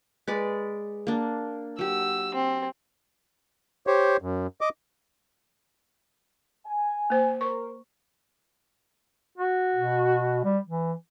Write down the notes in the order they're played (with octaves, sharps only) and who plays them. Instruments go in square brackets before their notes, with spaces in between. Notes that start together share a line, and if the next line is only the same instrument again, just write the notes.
[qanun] G#3 B4 D5
A#3 D4
[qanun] F#3 G4 [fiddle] E6
[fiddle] C4
[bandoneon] G4 C5 C#5
F#2
D#5 D6
[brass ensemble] G#5
[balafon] A#3 C5
[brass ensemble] A#4 C5 [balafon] C#6
[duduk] F#4
[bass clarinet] B2
G3
E3